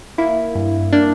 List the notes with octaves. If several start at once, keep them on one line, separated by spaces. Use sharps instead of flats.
A#3 E4
G2
A#3 D4